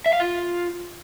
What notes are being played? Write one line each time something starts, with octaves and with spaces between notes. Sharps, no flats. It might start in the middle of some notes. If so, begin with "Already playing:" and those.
E5
F5
F4